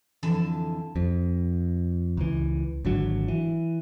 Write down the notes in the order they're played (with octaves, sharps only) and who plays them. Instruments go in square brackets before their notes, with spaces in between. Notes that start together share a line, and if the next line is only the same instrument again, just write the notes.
[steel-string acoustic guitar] F2 D3 E3 G#5 A5
[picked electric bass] F2
C#2 E3
G#1 D3 F#3
E3